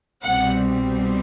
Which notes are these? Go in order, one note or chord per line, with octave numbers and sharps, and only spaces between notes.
C2 B2 G3 C4 F#5